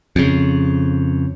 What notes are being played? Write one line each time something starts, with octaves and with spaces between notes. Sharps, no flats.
F2 C#3